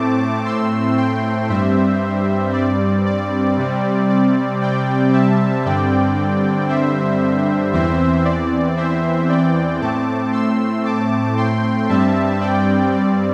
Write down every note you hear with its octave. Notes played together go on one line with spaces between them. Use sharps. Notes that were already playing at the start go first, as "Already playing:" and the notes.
Already playing: A2 A3 C4 A5 D6
C6 E6
G5 C6
G2 G3 C4 C5 E5
D5
D5
C3 G3 C4
D5
D5 G5
E5 A5
G2 D3 G3 C4 D5 G5
C5 E5
E2 E3 C4 C5 E5
D5
C5 E5
D5 G5
A2 A3 C4 A5 D6
C6 E6
A5 D6
G5 C6
G2 G3 C4 E5 A5
D5 G5
D5